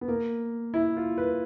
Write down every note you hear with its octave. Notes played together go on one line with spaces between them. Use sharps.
B3
A#3
E4
F4
B4